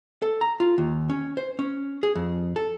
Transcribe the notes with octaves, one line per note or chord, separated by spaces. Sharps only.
A4
A#5
F4
D#2
C#4
C5
C#4
G#4
F2
A4